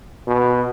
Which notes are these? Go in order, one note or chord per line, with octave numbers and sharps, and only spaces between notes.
B2